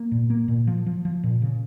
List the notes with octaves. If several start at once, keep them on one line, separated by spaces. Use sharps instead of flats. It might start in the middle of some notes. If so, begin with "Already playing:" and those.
Already playing: A#3
A#2
A#3
A#2
F3
F3
F3
A#2
C#3